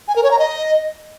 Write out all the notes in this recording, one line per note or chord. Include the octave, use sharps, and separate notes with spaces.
G#5
A#4
C#5
A#5
D#5